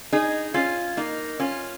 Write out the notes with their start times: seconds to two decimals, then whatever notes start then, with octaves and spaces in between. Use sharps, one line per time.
0.13 D#4 G#4
0.54 C#4 F4
0.97 A#3 D#4
1.40 C#4 F4